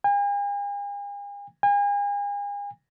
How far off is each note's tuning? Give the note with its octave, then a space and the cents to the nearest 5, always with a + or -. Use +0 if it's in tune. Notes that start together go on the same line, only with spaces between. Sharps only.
G#5 -45
G#5 -40